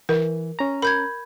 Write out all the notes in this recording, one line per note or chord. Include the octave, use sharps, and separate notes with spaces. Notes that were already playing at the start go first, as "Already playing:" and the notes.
E3 A#4
C#4 A#5
A#4 B5 G6 G#6